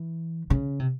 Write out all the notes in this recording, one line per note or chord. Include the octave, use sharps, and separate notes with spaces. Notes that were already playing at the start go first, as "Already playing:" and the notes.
Already playing: E3
C#3
C3